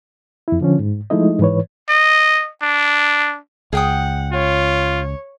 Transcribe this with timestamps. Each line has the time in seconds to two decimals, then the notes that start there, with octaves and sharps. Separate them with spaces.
0.48 F2 E4
0.61 D3 F3 C#4
0.79 G#2
1.10 F3 G#3 A3 D#4 E4 D#5
1.39 G#2 E3 B4 C#5
1.89 D#5
2.62 D4
3.73 C#2 G#4 F#5 G5 D#6
4.33 F4 C#5